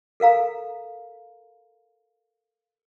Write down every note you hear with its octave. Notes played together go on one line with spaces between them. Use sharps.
A4 A#4 F5 A#5